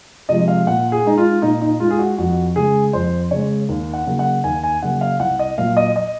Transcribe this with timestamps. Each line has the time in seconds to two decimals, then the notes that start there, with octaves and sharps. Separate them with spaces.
0.29 C3 F3 G#3 D#5
0.48 F5
0.67 A#2 F#5
0.92 G#4
1.05 G#3 D#4
1.17 F4
1.42 A#2 D#4
1.61 D#4
1.80 G#3 F4
1.91 G#4
1.99 F#4
2.18 F2 F#4
2.55 C#3 G#3 G#4
2.93 F2 C5
3.31 C#3 G#3 C#5
3.69 D#2
3.94 F#5
4.07 C#3 F#3 A#3
4.19 F#5
4.44 D#2 G#5
4.64 G#5
4.83 C#3 F#3 A#3 F#5
5.01 F5
5.19 C2 F#5
5.39 D#5
5.58 A#2 F#3 A#3 F5
5.77 D#5
5.96 D#5